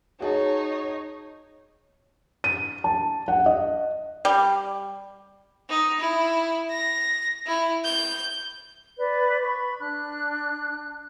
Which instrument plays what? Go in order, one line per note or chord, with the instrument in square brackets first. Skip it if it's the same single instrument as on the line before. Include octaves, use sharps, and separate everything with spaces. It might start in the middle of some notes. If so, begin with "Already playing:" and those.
[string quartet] D#4 C#5 [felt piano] F#4 G#4 A5
[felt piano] D#7
A5
F#5
D#5
[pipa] G3
[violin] D#4
E4
A#6
E4
G6
[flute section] B4 D5
B5 C#6
D4 F#6